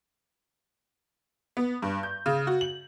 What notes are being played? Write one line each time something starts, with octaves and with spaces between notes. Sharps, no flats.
B3
G2
G6
C#3
F#4
F#7